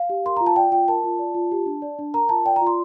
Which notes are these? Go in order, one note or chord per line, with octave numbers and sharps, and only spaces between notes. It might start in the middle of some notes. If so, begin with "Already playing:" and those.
Already playing: F5
G4
A#4 C6
F4 A#5
A5
D5 G5
F4 G5
A#4 A5
F4
D5
F4
G4
D4
D5
D4
A#4 A#5
F4 A5
D5 G5
F4 A#5
C6